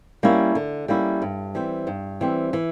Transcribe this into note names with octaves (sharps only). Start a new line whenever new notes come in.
G3 A#3 C#4 E4
D3
G3 A#3 C#4 E4
G2
E3 G3 C4
G2
E3 G3 C4
E3